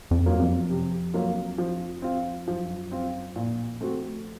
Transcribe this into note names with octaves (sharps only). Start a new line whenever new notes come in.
F2
F#3 A#3 F4
F2
C3
F#3 A#3 F4
F3
C4 F4
F#2 F3
C4 F4
F2 A#2
A3 C4 F#4